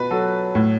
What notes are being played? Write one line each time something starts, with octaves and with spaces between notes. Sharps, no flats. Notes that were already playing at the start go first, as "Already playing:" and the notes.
Already playing: B2 B4
F#3 A4
A2